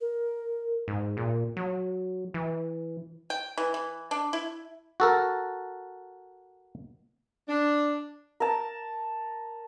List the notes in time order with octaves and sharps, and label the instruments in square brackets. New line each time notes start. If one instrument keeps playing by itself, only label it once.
[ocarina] A#4
[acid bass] G#2
A#2
F#3
E3
[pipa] G5
E3
E3
D4
E4
[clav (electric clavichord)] F#4 A4 A#4
[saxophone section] D4
[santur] A#4 A5